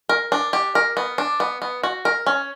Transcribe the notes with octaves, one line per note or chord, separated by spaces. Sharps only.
A#4
D4
G4
A#4
B3
D4
B3
B3
F#4
A#4
C#4